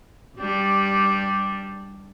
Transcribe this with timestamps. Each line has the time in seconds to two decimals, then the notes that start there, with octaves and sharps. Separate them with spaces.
0.38 G2 G3 D4